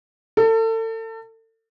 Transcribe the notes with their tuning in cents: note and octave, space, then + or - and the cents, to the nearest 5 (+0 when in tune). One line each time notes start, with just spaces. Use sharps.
A4 +35